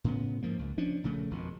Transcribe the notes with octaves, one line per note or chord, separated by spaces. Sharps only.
A2 C#3 B3
G#2 F3 A#3
C#2
F3 C#4 D4
A#1 C#3 A3
G#1 F2 B2